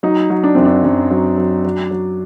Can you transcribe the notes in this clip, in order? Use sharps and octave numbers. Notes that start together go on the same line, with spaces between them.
F#3 D#4
F#3
D4
F#2 C4
D4
F#2
F#3
F#3
F#3
F#3